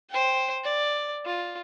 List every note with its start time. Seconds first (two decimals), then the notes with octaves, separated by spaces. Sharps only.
0.10 C5 G5
0.64 D5
1.25 F4